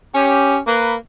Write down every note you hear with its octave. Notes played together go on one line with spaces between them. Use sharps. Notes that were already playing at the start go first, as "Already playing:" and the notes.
C#4 G4
A#3 B4